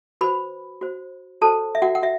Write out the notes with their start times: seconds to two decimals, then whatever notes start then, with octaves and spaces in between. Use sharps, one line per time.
0.21 F#4 B4 C5 B5
0.81 F#4 C5
1.41 F#4 A4 C5 A5
1.75 E5
1.82 F#4 F#5
1.95 F#5
2.02 F#4 E5